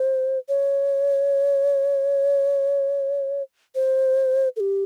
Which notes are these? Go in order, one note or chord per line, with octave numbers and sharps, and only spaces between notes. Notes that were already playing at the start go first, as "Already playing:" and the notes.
Already playing: C5
C#5
C5
A4
G4